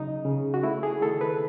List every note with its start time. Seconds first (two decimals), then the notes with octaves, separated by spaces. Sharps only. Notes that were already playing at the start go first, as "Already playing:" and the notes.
Already playing: C#3 F#3 D#4
0.25 C#3
0.54 F#4
0.63 A3 E4
0.83 G#4
1.02 D#3 A4
1.21 B4